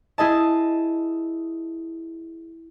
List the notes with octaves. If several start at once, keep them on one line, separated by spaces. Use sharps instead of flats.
E4 G#4 D#5 A5